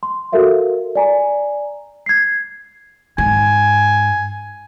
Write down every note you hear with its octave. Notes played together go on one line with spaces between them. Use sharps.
C6
F#4 A4 A#4 E5 F5
D5 G#5 A#5
G#6 C7
G#2 G#5